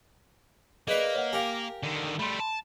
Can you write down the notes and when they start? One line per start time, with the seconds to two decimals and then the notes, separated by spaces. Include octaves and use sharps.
0.88 A#3 D#4 G#4 B4 D5 E5
1.14 C#5 F#5
1.33 G4 A#4 F5 G5 G#5
1.83 D3 D#3
2.19 G3 A3 B5 C6
2.40 A5